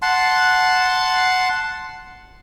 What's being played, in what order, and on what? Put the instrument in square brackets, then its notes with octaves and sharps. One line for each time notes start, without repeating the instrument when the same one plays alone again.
[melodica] F#5 A5 C6